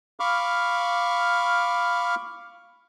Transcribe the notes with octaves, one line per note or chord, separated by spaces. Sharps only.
F5 B5 C#6 D6 F6